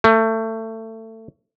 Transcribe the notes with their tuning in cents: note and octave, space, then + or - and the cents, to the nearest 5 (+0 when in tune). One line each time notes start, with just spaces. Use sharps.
A3 +25